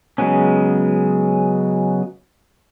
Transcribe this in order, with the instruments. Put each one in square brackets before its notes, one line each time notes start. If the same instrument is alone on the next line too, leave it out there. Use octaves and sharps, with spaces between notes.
[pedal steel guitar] C#3 F#3 G#3 B3 C#4